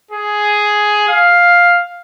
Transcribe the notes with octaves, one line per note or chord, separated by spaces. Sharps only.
G#4
F5